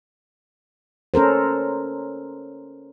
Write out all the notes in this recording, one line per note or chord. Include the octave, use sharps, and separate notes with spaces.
C#4 A4 A#4 C5